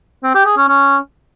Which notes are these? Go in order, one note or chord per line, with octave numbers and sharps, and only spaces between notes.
C4
G4
G#4
C#4
C#4